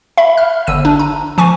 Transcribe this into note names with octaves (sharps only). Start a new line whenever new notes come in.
E5 B5
F6
G1 E6 D#7
D4
A#5
F3 G#5 C#6